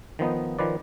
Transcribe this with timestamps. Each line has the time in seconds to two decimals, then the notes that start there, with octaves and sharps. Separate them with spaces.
0.19 D#3 F3 B3 D#4
0.59 D#3 F3 B4 D5